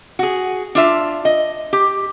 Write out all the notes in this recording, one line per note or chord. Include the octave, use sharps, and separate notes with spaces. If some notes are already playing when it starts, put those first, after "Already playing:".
F#4 G#4
D4 F4 E5
D#5
G4